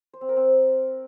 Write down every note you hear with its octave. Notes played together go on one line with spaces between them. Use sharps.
C5
C4
A#4
C4